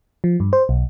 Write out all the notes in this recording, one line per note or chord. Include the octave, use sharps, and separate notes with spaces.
F3
G2
C5
B1